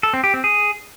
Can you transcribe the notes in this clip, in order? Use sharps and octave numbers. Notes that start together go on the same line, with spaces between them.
A4
C4
G4
C4
G#4